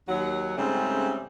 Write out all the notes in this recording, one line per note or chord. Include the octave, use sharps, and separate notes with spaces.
D#2 F#3 F#5
G#2 C#3 G3 A3 C4 C#4